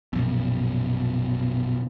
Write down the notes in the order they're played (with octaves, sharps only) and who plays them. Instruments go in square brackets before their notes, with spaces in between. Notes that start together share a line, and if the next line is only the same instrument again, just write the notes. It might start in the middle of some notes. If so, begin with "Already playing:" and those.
[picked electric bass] A#1 F#2 [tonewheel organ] B2